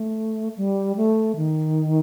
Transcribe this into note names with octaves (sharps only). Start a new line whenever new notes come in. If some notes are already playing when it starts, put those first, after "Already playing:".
Already playing: A3
G3
A3
D#3